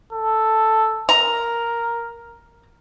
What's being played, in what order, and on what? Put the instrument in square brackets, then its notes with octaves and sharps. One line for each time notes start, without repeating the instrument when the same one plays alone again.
[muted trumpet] A4
[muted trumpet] A#4 [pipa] A#5